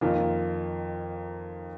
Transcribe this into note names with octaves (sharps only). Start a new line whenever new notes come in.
F2 D#3 A#3 F4